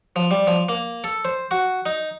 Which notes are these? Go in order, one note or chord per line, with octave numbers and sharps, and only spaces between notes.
F3
G3
F3
A#3
A4
C5
F#4
D#4